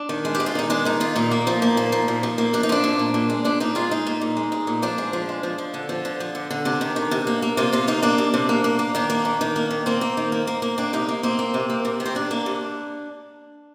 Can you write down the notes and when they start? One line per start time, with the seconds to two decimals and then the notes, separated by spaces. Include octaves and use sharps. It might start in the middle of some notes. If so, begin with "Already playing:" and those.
Already playing: D4
0.09 D#3
0.25 G#3
0.35 G4
0.40 G#3
0.46 F4
0.55 D#3 D#4
0.70 G#3 D4
0.85 D#3 D#4
1.00 D#3 F4
1.16 A#2 D#4
1.31 A#3
1.47 F3
1.62 A#3
1.77 A#2
1.92 F3
2.08 A#2
2.23 F3
2.38 A#3
2.53 F3 D4
2.63 D#4
2.69 F3 D4
2.84 A#2
2.99 A#2
3.14 A#2
3.30 G#3
3.45 A#2 D4
3.60 A#2 D#4
3.75 G#3 F4
3.91 G#3 D#4
4.07 A#2
4.21 A#2
4.37 G#3
4.52 G#3
4.67 A#2
4.82 F3 D4
4.98 G#3
5.13 F3
5.29 G#3
5.43 F3
5.58 F3
5.74 D3
5.89 F3
6.05 D3
6.20 F3
6.35 D3
6.51 D3
6.65 C3 D4
6.81 D#3
6.96 D#3
7.11 C3
7.27 A#3
7.42 A#3
7.57 C3 F4
7.72 C3 F4
7.88 A#3 D#4
8.03 A#3 D4
8.18 C3
8.34 C3
8.49 A#3
8.64 A#3
8.79 A#3
8.95 D#3 D4
9.10 A#3
9.25 D#3
9.41 D#3
9.56 A#3
9.71 D#3
9.86 A#3 C4
10.01 A#3
10.17 D#3
10.32 A#3
10.47 A#3
10.62 A#3
10.78 A#3 D4
10.93 C3 D#4
11.09 A#3
11.23 A#3 C4
11.39 A#3
11.54 C3
11.70 A#3
11.85 C3
12.00 D#3
12.06 C4
12.15 C3 D4
12.31 A#3
12.46 C3